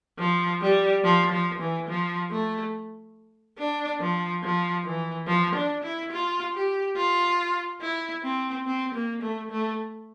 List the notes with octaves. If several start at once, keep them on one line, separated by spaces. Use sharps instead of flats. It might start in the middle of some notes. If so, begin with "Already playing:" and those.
F3
G3
F3
F3
E3
F3
A3
D4
F3
F3
E3
F3
D4
E4
F4
G4
F4
E4
C4
C4
A#3
A3
A3